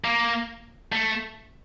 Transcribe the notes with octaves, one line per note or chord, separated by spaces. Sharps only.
A#3
A3